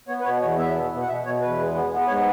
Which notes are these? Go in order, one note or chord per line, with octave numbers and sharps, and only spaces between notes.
B3 C#5
B4
B2 C#5
E2 C#5
B3 E5
B2
B2
F#5
B2 E5
B2 C#5
E2 B4
G#3
B3
B3
G#2 C#5